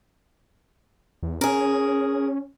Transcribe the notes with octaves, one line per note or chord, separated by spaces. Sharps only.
E2
C#4 G#4 A#4